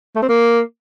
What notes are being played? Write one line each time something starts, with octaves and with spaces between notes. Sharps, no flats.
A3
C4
A#3